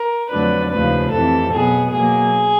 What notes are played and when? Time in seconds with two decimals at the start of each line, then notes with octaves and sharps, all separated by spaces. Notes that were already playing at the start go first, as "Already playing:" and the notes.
Already playing: A#4
0.30 F2 D3 F#3 A3 D4 B4
0.71 D#2 C#3 F3 A3 B4
1.11 F2 C3 E3 A4
1.52 B2 F#3 B3 G#4
1.92 B2 F#3 A#3 G#4